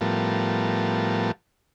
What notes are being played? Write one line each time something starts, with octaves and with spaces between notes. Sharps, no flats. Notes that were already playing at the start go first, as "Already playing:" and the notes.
A2 F3 G3 B3 A#4 A5